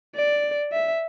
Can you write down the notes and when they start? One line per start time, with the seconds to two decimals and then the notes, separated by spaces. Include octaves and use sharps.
0.16 D5
0.72 E5